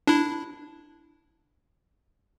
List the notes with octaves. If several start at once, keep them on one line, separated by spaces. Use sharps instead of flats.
D4 E4